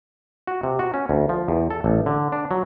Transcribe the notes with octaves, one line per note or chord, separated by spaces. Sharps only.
F#4
C3
F#4
C#4
D2
F3
E2
A4
A1
D3
D4
F#3